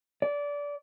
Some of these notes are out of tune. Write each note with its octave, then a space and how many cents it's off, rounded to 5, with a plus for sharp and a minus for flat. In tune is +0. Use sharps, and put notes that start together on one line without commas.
D5 -20